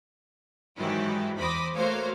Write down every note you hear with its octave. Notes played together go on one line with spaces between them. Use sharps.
G#2 D#3 E3 F#3 E4 G4
E2 C5 B5 D6 D#6 A#6
A3 A#3 F#4 C5 C#5 F5